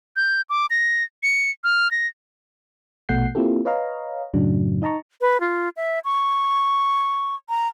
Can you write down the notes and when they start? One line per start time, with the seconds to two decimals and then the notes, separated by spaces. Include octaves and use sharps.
0.16 G6
0.50 D6
0.70 A#6
1.23 C#7
1.64 F6
1.91 A#6
3.09 A#1 B2 A3 F#5 G6 C7
3.35 A#3 C4 E4 F4 G4 A4
3.65 B4 C#5 D#5 F5 A#5
4.34 F#2 A2 C#3 F#3 D4
4.82 D#4 D#5 A5 A#5 C#6
5.21 B4
5.40 F4
5.76 E5
6.05 C#6
7.49 A#5